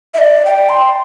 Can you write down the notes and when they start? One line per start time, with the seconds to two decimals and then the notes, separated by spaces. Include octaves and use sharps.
0.14 E5
0.18 D5
0.46 G5
0.69 C6